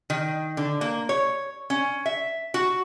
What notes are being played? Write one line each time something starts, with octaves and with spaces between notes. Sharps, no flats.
D#3
D3
A#3
C#5
C#4
E5
F#4